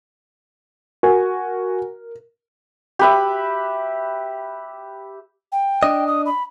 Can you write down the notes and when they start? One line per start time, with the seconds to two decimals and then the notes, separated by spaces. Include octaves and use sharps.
1.03 F#4 A#4 G#5
2.99 G4 B4 E5
5.52 G5
5.83 D4 D#5
6.07 D#6
6.26 B5